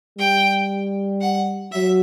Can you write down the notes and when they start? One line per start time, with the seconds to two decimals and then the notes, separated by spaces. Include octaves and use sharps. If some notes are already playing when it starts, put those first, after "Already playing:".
0.19 G3 G5
1.21 F#5
1.72 F#3 E5